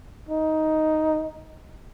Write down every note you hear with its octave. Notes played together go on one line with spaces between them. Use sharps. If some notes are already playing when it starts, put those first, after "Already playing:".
D#4